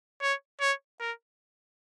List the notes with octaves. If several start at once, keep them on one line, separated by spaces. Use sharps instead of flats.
C#5
C#5
A#4